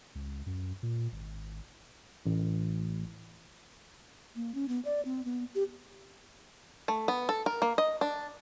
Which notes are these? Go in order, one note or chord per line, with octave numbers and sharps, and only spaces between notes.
C#2
F#2
A#2
G#1
A1
A#3
C#4
B3
D5
C4
B3
G4
A3
B3
A4
A#4
A#3
D#5
D4